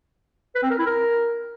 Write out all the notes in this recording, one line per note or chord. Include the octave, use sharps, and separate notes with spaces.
B4
C4
A#4
E4
A#4